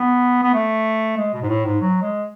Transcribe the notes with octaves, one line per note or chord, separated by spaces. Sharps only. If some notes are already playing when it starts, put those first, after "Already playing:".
Already playing: B3
B3
A3
G#3
B2
G#2
A2
G#2
F#3
G#3